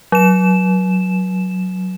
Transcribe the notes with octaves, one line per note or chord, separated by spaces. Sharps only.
F#3 E7